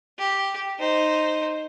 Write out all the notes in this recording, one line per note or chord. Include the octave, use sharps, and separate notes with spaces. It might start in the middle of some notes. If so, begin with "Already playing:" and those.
G4
D#4 C5